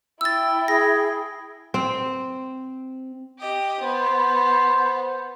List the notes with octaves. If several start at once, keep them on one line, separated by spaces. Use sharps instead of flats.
E4 G5 E6 A6
G#4 A#6
C4
G4 D#5
B3 C5